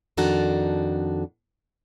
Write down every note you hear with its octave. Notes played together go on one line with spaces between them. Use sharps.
F2 D#3 D4 F#4 A4 A#5